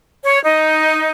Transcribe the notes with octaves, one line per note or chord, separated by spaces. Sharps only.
C#5
D#4